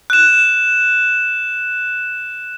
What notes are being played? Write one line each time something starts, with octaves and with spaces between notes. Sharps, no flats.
F#6 E7